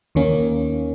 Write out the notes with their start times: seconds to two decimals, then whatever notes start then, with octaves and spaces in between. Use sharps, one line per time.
0.15 D#2 D#3 A#3 C#4